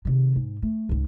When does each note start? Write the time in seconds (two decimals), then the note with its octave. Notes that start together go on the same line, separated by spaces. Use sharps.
0.05 C3 D#3
0.36 G#2
0.62 A3
0.89 C#2 G#2